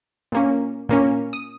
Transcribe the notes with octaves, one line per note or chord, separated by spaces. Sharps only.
A#2 A#3 C#4
A#2 A#3 C#4
D#6